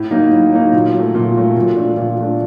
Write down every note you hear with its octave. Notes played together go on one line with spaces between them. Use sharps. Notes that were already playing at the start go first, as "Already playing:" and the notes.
Already playing: A2
F#3 A#3 D#4
A2
F#3 A#3 D#4
A#2
F#3
A3
A#2
F#3 A3
A#2
F3 A3 D4
A#2
F3 A3 D4